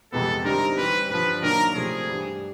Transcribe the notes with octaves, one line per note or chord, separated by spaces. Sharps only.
F2 C3 E3 G#3 B3 A4
D3 G3 C4 D#4 A#4
E3 G3 C4 B4
G2 D3 F3 B4
D#3 F#3 A#3 D4 A#4
C3 F3 A3 C4 G#4
G2 E3 G3